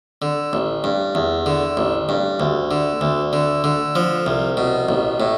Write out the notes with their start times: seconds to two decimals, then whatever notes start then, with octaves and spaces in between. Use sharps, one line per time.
0.22 D3
0.53 A1
0.84 G2
1.15 E2
1.46 D3
1.77 A1
2.09 G2
2.40 D2
2.71 D3
3.01 D2
3.33 D3
3.64 D3
3.95 F3
4.26 C2
4.57 B2
4.89 A1
5.20 A2